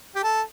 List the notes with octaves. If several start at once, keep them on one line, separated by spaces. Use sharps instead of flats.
G4
A4